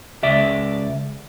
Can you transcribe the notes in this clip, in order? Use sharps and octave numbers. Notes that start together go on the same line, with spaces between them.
C#2 D5 E5